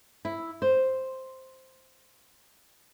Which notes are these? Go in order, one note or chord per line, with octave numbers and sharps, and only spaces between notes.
E4
C5